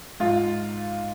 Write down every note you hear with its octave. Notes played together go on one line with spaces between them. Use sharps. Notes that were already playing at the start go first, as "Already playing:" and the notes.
G#2 F4